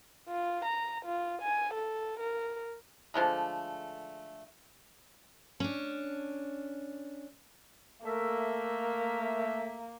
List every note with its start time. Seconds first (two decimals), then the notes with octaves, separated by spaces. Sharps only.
0.28 F4
0.65 A#5
1.05 F4
1.42 G#5
1.74 A4
2.19 A#4
3.14 D3 F3 G#3 A3
5.60 C#4 D4
8.05 A3 A#3 A#4 E5